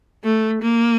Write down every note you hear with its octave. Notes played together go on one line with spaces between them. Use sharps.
A3
A#3